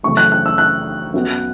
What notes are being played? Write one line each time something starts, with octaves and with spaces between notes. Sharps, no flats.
F#2 C#3 E3 A3 C#6
F#6
F#6
E6
F#6
F#2 F#3 B3